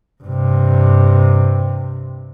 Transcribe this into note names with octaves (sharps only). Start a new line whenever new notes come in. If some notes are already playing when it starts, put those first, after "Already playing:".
G2 C3